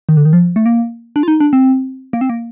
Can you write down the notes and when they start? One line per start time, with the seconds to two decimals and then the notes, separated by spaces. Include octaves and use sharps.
0.09 D#3
0.17 D3
0.25 D#3
0.33 F3
0.56 A3
0.66 A#3
1.16 D4
1.23 F4
1.28 D#4
1.40 D4
1.53 C4
2.13 A#3
2.21 C4
2.30 A#3